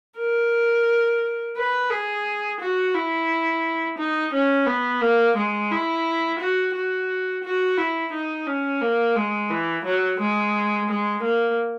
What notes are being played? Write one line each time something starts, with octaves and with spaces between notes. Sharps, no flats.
A#4
B4
G#4
F#4
E4
D#4
C#4
B3
A#3
G#3
E4
F#4
F#4
F#4
E4
D#4
C#4
A#3
G#3
E3
F#3
G#3
G#3
A#3